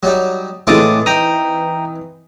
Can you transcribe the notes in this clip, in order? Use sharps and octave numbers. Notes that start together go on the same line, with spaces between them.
F#3 G3 D#4
A2 E3 G#3 C4 F4 A4 D6 D#6
D#4 G5 A#5 D#6